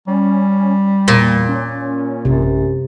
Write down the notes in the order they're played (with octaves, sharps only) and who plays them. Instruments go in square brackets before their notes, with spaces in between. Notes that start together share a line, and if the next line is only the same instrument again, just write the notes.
[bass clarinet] G3 [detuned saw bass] C#4
[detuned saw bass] E2 [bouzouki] A#2
[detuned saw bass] C#4
[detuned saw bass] A1 [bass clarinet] F#2 [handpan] C3